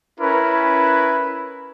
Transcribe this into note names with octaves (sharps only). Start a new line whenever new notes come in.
C#4 E4 A#4 B4